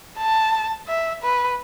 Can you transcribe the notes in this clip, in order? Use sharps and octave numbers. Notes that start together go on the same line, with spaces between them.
A5
E5
B4